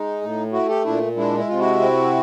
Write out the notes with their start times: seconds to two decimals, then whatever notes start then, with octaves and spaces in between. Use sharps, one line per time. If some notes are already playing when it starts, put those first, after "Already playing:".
Already playing: G#3 D#4
0.21 A2
0.53 A3 E4 F#4
0.68 G4 A4
0.85 A#2 D4 E4
1.17 G#3 D4 E4
1.38 E4
1.49 C3 F4
1.59 E4 F#4
1.80 C4